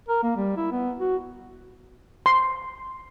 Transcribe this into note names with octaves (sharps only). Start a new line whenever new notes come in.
A#4
A#3
G3
E4
B3
F#4
C6